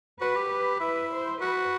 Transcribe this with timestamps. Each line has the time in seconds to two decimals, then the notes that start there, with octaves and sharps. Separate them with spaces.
0.21 F#4 B4
0.35 G4
0.51 B4
0.80 E4
1.11 C5
1.40 F#4 B4